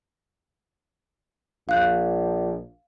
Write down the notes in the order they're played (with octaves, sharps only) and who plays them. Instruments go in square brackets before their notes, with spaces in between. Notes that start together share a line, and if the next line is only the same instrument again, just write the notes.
[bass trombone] A#1 [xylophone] F5 F#6 G6